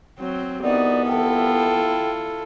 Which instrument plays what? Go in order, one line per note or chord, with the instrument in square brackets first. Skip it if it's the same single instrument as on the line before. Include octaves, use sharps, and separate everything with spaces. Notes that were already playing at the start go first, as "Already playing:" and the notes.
[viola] F#3 [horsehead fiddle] C4
[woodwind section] C2 E3 B3 [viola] D#4 F#4 [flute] D5
[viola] E4 F4 [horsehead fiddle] A4 [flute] G5